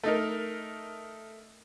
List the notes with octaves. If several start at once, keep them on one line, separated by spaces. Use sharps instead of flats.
A3 D#4 A#4